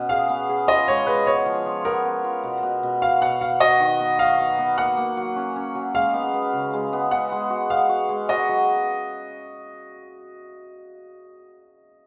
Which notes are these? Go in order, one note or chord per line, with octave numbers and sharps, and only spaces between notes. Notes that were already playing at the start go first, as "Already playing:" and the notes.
Already playing: B2 C#4
G#4 F5
B3
G#4
F4 D#5
G#3 C#5
G#3 B4
B3 C#5
F3
F3
B3 A#4
B3
F4
B2
B2
B2
F#4 F5
B2 F#5
F#4 F5
F#4 D#5
D#3
B3
F#3 F5
F#4
B3
A#3 F#5
A#3
F#3
C#4
C#4
F#3
G#3 F5
B3
B3
C#3
G#3
B3
B3 F#5
G#3
F#4
B3 F5
F#4
G#3
F#4 D#5
F#3